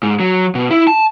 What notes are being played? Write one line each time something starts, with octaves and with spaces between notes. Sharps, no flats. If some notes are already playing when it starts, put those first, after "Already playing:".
G#2
F#3
B2
E4
A5